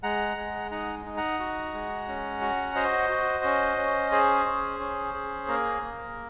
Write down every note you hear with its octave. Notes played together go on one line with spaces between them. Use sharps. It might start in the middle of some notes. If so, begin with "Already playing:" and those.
G#3 F#5 A#5
G#3
D#4 F#5 A#5
D#4
F#5 A#5
F#4
G#3
C#4
F#4
F#4 C5 D#5
F#4
C#4
C#4
G#4 C5
C#4
C#4
G#4
A#3 A#4
A#3